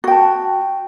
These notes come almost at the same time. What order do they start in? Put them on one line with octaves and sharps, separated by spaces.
F#4 G5 A5